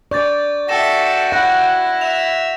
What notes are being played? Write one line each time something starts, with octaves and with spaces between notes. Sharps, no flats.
D5 C#6 G6 A6
F#4 A4 E5 G5 A#6 E7
E4 F#5 A#6
E5 F7